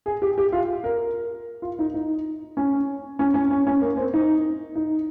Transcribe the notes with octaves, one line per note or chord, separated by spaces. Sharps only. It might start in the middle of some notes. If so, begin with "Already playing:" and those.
G#4
G4
G4
F4
A#4
F4
D#4
D#4
C#4
C#4
C#4
C#4
C#4
A#3
C4
D#4
D#4